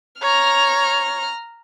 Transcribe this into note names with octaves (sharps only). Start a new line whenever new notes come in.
C#5 A#5 F6